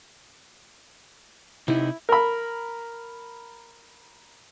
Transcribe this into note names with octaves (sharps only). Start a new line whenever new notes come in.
C3 D#4 E4
A#4 B5